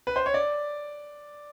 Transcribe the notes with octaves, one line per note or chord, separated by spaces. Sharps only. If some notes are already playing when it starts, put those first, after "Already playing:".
B4
C5
C#5
D5